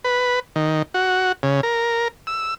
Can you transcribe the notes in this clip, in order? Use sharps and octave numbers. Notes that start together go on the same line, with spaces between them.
B4
D#3
F#4
C#3
A#4
E6